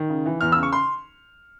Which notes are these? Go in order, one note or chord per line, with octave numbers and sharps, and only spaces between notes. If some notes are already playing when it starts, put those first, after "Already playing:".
Already playing: D#3
C#3
E3
E2 F6
E6
C#3
C#6
C6